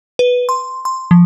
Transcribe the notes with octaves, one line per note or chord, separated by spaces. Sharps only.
B4
C6
C6
F3